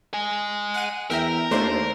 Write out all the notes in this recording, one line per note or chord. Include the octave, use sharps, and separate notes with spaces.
D#5 G#5
F#5 D#7
E2 A#4 E5 G5 A#5
D#2 A3 D4 C5